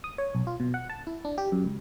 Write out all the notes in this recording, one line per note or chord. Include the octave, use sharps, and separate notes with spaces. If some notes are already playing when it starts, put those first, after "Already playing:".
D#6
C#5
B1
F4
B2
F#5
A5
E4
D4
G4
F#2
C#2